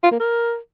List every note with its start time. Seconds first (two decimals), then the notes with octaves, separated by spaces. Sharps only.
0.03 F4
0.11 A#3
0.20 A#4